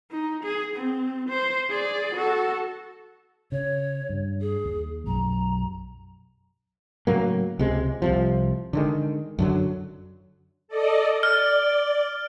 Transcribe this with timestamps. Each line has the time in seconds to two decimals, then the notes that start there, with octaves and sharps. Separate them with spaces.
0.11 D#4
0.44 G#4
0.76 C4
1.29 C5
1.69 G#4 D5
2.15 F#4 A4
3.52 C#3 C#5
4.09 G2
4.41 G#4
4.65 D#2
5.07 B1 F#2 A#5
7.07 A2 C#3 F#3 A#3
7.59 C#2 C3 G#3
8.02 C2 C3 F3
8.73 D3 D#3 G#3
9.39 F#2 D3 F#3
10.68 A4 D5 D#5
11.23 D5 F6